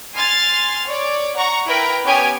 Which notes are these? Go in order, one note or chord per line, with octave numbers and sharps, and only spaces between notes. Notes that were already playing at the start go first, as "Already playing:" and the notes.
G#5 C6 F6 A6
C#5 D5
F#5 A#5 C#6
E4 A#4 B4 G5 A#5
B3 C#4 G4 C#5 G5 G#5